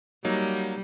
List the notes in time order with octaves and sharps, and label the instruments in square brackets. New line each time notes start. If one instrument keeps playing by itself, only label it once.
[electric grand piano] F#3 A#3 D#4 [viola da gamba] G3